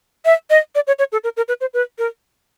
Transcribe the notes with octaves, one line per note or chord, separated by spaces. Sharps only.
E5
D#5
D5
C#5
C#5
A4
A#4
A#4
B4
C5
B4
A#4